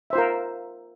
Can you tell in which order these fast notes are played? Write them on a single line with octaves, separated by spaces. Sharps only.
E5 C5 F4 A#4